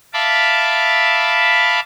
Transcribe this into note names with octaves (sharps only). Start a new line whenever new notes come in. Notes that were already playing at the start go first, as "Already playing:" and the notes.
E5 F5 A5 B5 D6